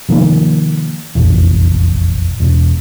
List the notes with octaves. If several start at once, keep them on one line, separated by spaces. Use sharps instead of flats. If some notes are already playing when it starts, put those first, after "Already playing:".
C3 D#3 F3 A#3
F1 A#1 E2
E1